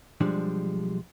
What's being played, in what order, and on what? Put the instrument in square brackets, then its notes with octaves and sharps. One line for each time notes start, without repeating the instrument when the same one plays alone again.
[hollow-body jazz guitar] B1 F3 G3 G#3 D4